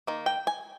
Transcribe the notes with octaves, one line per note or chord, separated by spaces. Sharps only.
D#3 A#3
G5
G#5